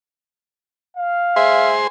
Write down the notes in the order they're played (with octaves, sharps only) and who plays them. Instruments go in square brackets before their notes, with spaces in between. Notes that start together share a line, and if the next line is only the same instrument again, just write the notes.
[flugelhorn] F5
[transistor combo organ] G#4 C5 C6 [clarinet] E5